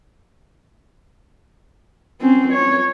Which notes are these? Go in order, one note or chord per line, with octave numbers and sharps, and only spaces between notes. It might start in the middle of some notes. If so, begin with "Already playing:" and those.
C4 C#4
C#5